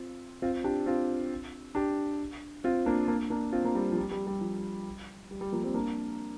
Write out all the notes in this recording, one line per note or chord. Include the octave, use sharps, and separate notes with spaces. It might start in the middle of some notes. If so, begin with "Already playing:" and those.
Already playing: C4 F4
C4 F4
D4 G4
C4 F4
D4 G4
C4 F4
A#3 D4
A#3 D4
A#3 D4
C4 F4
A#3 D4
G3 C4
F3
G3
G3
G3
F3
G3
G3
F3 A#3
G3 C4
A#3 D4